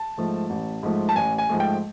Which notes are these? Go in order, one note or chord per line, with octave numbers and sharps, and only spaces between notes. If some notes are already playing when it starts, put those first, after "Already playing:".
Already playing: A5
G#2 F3 A3
A1
G#2 F3 A3
A5
A1 G#5
G#5
G#2 F3 A3
G5